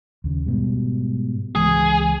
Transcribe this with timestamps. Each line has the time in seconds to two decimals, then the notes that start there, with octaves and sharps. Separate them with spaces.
0.24 D#2 C#3
0.46 G#2 B2 G3
1.55 C#2 E3 G#3 G#4